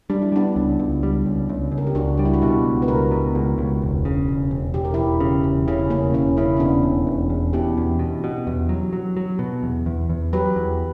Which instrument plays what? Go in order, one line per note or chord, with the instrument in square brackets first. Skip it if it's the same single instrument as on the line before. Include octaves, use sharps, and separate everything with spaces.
[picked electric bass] G3 [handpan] D4
[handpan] E4
[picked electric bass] G3 [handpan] B3 D4
[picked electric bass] C#2
C#2
G3
C#2
C#2
C#2
[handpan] A#4
G4
[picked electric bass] C#2 [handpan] D4 F#4
[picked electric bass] G3 [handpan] D4
[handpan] E4
F#4
[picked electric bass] B2 [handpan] E4 G4
[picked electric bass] C#2
[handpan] B4
[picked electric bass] C#2 [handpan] F#4 A#4
[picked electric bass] B2
C#2
C#2
E1
C#3
E1
E1
[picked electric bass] E1 [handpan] G4
[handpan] A#4
[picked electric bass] E1 [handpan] E4 G4
[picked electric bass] C#3
E1
[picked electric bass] C#3 [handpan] C#4 E4
[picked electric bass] E1 [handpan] A#3 C#4
[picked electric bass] E1 [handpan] C#4 E4
[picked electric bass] C#3 [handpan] C#4 E4
[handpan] E4
[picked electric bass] E1 [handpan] B3 D4
[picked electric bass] E1
E1
E2
[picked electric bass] B2 [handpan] E4 G4
[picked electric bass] E2
B2
B2
E2
F#3
F#3
F#3
B2
E2
E2
E2
[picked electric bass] F#3 [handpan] G4 B4
[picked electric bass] E2